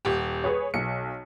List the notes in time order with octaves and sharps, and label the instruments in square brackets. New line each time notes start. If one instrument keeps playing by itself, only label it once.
[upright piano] D#1 G4
[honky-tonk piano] G#4 B4 C#5
[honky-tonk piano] B1 [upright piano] C#7